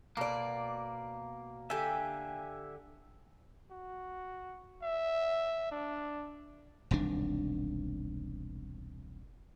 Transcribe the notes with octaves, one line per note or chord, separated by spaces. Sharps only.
B2 A#3 D5
D3 G4 E5 G#5
F#4
E5
D4
E1 C2 D#3 D4